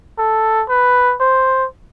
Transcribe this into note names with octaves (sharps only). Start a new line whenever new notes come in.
A4
B4
C5